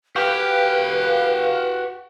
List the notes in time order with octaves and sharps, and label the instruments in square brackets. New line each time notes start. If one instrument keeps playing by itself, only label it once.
[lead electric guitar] F#4 G5 [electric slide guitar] G4 [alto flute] B4 [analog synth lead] F5